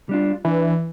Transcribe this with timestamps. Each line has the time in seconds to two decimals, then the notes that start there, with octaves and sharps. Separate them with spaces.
0.09 G3 D4 F4
0.45 E3 D4